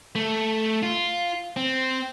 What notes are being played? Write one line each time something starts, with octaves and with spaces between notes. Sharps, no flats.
A3
F4
C4